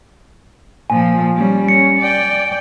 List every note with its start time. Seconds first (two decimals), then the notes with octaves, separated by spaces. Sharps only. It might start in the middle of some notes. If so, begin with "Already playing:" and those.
0.90 A#2 F3 G#5
1.36 G3 C#4
1.68 C#4 C#7
1.99 D5 G5